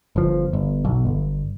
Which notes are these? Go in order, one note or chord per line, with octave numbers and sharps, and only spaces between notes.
G1 F3
G1
B1
G1